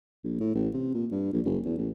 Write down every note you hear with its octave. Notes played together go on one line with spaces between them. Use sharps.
A#1
A2
A1
C3
A#2
G2
A#1
F#1
E2
A1